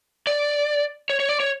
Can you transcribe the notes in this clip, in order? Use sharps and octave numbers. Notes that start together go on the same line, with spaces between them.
D5
C#5
C#5
D5
C#5